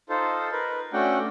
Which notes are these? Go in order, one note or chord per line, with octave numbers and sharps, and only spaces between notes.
D#4 F4 A4 C5
A#4 B4
A3 C#4 D4 F#4 F#5 G5